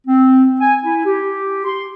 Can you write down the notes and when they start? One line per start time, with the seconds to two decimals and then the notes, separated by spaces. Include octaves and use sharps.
0.07 C4
0.60 G#5
0.83 E4
1.06 G4
1.65 C6